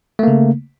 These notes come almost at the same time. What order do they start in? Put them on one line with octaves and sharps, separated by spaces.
A3 A#3 C#3